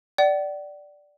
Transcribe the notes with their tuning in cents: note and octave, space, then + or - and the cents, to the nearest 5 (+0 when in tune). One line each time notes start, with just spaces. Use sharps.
D5 +0 F#5 +45